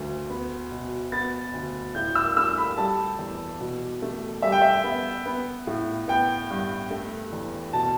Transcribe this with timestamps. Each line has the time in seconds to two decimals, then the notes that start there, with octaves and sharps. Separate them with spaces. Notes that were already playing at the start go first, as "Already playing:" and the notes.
Already playing: D2 A3
0.30 B3
0.71 B2
1.12 B3 A6
1.53 D2
1.95 A2 G6
2.15 E6
2.37 A3 E6
2.57 B5
2.77 G3 A5
3.19 E2
3.61 B2
4.02 A3
4.42 G3 E5
4.52 G5
4.62 E5
4.84 B3
5.26 B3
5.67 A2
6.08 B3 G5
6.50 G2
6.91 A3
7.33 E2
7.73 B2 A5